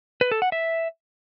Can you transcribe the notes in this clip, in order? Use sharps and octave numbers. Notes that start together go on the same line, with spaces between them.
B4
A4
F#5
E5